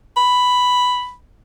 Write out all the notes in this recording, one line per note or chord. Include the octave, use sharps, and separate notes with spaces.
B5